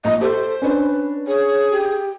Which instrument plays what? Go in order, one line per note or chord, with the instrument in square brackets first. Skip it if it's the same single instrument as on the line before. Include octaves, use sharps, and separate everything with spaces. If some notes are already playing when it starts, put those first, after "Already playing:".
[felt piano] A#1 [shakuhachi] D#5
[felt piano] G4 [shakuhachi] A4 [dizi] C5
[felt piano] C#4 D4 [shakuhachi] B4
[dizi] G#4 [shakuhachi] C#5
[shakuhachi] G4